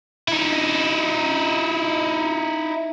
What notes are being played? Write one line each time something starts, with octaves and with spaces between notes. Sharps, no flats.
D#4 E4